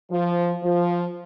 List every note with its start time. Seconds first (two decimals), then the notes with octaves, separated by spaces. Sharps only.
0.11 F3
0.63 F3